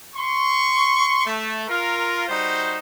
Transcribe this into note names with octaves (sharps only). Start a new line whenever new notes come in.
C6 C#6
A3
F4 A#4
G3 D#4 F#4 C5